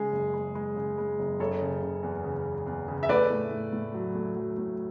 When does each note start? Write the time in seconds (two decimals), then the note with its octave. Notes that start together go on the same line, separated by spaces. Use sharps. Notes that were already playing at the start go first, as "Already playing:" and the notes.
Already playing: C#3 G#3 G#4
0.12 F#1
0.34 G#3
0.55 G#3
0.76 C#3
0.98 G#3
1.19 F#1
1.39 F#1 A4 C#5
1.61 C#3
1.82 C#3
2.03 E2
2.24 C#3
2.46 E2
2.67 E2
2.88 C#3
3.03 E5
3.09 A3 B4 D5
3.30 A2
3.51 A2
3.73 A2
3.94 F#3
4.15 A3
4.37 F#3
4.58 A2